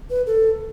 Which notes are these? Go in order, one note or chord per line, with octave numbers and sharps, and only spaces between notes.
B4
A4